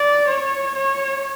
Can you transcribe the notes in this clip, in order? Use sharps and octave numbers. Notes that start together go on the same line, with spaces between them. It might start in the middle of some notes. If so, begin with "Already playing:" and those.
Already playing: D5
C#5
C#5